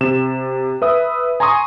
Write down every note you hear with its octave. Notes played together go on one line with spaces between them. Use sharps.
C3 E7
B4 E5 D#6
G#5 A#5 C6 C#6 D#6